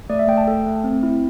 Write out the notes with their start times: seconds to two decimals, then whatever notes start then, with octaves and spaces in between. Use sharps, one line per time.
0.09 A3 D5
0.19 E5
0.28 A3 G5
0.37 A5
0.48 A4 G5
0.66 A3
0.84 C4
1.03 E4